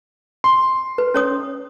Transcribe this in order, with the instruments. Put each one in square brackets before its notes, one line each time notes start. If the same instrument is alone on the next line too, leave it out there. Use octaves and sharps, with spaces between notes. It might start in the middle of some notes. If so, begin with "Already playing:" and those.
[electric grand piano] C6
[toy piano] B4
C#4 C#5 D#6